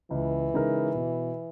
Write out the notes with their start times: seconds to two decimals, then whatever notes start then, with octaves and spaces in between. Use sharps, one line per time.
0.11 C#2 E3
0.54 C#3 G#3 D#4 A#4
0.95 B2